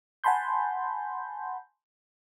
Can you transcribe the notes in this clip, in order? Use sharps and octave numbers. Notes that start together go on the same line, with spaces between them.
F#5 G#5 A5 B5 C6 G6